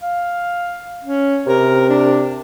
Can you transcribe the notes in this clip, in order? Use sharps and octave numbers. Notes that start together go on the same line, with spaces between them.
F5
C#4
C3 A#4
D4